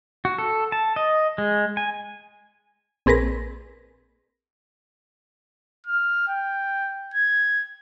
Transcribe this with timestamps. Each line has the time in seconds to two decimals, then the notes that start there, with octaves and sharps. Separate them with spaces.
0.25 F#4
0.38 A4
0.72 A5
0.96 D#5
1.38 G#3
1.77 G#5
3.06 A#1 C4 G#4 A#4 B4 A#6
5.87 F6
6.28 G5
7.14 G#6